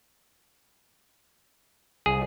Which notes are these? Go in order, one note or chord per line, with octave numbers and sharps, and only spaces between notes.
C2 G#4